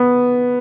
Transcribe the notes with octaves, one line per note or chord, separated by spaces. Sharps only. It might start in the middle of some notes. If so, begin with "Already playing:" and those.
Already playing: B3